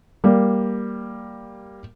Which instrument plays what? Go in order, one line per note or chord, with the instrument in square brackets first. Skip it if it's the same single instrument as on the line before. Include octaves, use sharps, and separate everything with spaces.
[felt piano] G3 A#3